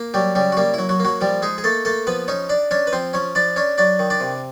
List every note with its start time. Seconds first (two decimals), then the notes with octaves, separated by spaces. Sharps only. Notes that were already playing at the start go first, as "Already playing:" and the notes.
Already playing: A#3
0.14 F#3 G3 G4
0.35 C#3 G3 G4
0.52 F#4
0.57 G3 A#3 G4
0.74 F#3 E4
0.89 F#3 F#4
1.00 A#3
1.05 F#3 F#4
1.21 F3 G3 G4
1.42 G#3 D#4 G#4
1.58 G#4
1.64 A3 A#3 A4
1.85 A3 A#3 A4
2.07 F3 B3 B4
2.28 C#4 D#4 C#5
2.49 D4 D5
2.71 C#4 D4 C#5
2.87 B4
2.92 F3 C4 C5
3.13 F3 C#4 C#5
3.35 F3 D4 D5
3.56 C#4 D4 C#5
3.78 F#3 D4 D5
3.99 D#3
4.10 D4 D5
4.20 C3